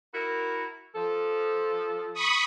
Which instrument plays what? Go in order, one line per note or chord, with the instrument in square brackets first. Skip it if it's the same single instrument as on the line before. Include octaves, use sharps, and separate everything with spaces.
[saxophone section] E4 F#4 A#4
F3 A4
[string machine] B5 C#6 D#6